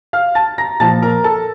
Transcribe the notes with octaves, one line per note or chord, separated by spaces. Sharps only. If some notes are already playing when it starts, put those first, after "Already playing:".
F5 F6
A5 A6
A#5 A#6
A#2 F3 A5 A6
A#4 A#5
A4 A5